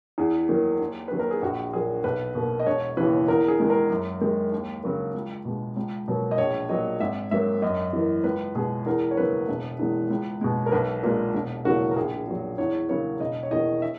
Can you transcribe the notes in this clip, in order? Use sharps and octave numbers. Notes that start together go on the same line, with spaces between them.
E2 G#4
D#3 F#3 A#3
D#2
D#3 F#3 A#3 B4
A#4
G#4
A#1 F#4
A#2 F#3 A#3 G#4
B1 B4
B2 A#3
D#5
E1 C#5
D#2 C#3 E3 B4
E2 A#4
G#4
D#3 G#3
A#4
F#2
D#3 G#3
D#2
C#3 F#3 A#3
C#2
B2 G#3
C#2
B2 F#3 A#3
D#5
A#1 C#5
A#2 F#3 A#3 D#5
G#1 E5
G#2 F#3 A#3 E5
F#2 D#5
E3 A#3
C#2 B4
B2 G#3 G#4
E2 A#4
C#5
C#3 F#3 A#3 B4
E1
E2 D#3 G#3
C#2
B2 G#3
A#4
B1 B4
A#2 G#3 A#4
E1
E2 C#3 F#3 A#3 F#4
A#4
A#1 G#4
A#2 F#3
E2 C#5
C#3 F#3 A#3 C#5
E1 D#5
C#5
E2 D#3 D#5
E5